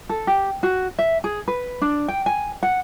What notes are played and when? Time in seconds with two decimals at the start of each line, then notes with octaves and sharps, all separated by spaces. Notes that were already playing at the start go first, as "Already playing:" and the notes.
0.09 A4
0.27 G4
0.63 F#4
0.99 E5
1.24 G#4
1.48 B4
1.82 D4
2.08 G5
2.26 G#5
2.63 F#5